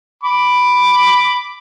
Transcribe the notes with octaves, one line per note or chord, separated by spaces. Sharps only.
B5 D6